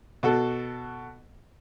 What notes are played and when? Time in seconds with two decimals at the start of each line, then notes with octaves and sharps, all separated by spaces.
0.23 B2 F#4 A4